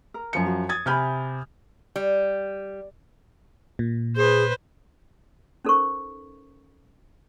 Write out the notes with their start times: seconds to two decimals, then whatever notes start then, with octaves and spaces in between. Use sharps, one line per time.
0.14 A#4
0.33 F#2 F3 C#7
0.46 F#4
0.69 D#6 G#6 A6
0.86 C3 E5 G#5 B5 F6 G6
1.96 G3
3.79 A#2
4.17 G#4 B4 C5
5.65 C#4 D#4 A4 A#4 C5 C#6